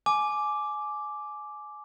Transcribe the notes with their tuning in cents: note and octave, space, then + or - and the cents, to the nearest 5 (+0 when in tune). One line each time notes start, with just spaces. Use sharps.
G#5 +25 D6 +0